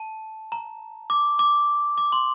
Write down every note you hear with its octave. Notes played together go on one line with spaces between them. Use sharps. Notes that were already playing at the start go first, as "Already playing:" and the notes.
Already playing: A5
A#5
D6
D6
D6
C6